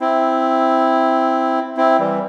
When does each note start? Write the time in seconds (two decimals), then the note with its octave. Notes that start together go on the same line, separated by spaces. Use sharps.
0.01 C4 E4
1.77 C4 E4
1.99 E3 G3